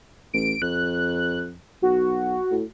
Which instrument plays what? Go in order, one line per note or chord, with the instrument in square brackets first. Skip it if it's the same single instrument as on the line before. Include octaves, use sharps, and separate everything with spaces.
[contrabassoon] A1 [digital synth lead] D7
[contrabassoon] F2 [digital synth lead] F#6
[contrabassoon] B1 [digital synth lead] F#4
[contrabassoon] A2